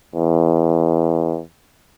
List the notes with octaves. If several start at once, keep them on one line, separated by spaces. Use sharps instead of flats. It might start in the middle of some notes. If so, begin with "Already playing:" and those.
E2